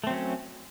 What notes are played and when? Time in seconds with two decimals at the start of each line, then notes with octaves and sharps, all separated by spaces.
0.04 A3
0.07 C4
0.10 F#3
0.14 C#4